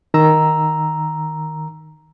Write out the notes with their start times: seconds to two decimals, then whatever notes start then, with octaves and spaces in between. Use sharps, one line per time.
0.14 D#3 A#5 E6